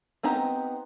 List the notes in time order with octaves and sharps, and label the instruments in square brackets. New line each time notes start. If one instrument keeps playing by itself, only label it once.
[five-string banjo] B3 C4 D#4 G4 A#5